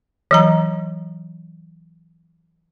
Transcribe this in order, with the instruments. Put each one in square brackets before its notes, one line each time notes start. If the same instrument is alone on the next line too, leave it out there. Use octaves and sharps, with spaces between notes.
[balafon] E3 F#3 A#5